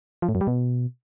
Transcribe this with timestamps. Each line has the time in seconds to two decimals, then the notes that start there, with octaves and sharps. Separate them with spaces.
0.22 F3
0.29 A2
0.35 F#2
0.41 G3
0.47 B2